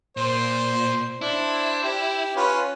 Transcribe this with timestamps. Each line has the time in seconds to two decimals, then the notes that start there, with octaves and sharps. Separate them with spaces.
0.17 A#2 C5
1.21 D4 E4 C5
1.84 G4
2.36 C#4 F4 B4